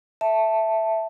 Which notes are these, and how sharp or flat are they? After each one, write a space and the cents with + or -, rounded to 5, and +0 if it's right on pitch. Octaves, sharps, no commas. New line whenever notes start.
E5 +0 A5 +0